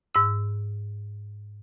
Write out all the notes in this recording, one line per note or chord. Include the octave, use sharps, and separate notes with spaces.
G#2 E6